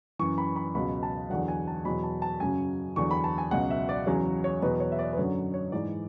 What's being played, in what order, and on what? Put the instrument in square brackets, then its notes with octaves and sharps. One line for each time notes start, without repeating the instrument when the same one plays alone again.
[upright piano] F#2 E3 C#6
B5
B5
C#2 B2 F#3 B5
A5
E2 D3 F#3 F#5
G#5
A5
E2 B2 F#3 B5
A5
A5
F#2 C#3 F#3 G#5
E2 D3 F#3 C#6
B5
A5
G#5
C#2 B2 F#3 F#5
E5
D5
E2 C#3 F#3 C#5
C#5
E2 B2 F#3 B4
C#5
E5
D5
B4
F#2 D3 F#3 C#5
C#5
G#2 E3 D5